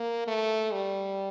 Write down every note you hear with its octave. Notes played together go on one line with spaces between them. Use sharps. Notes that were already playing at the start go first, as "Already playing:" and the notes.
Already playing: A#3
A3
G3